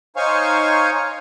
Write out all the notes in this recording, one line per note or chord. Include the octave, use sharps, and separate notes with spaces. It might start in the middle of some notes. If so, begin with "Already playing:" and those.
D#4 C5 C#5 F5 G#5 C#6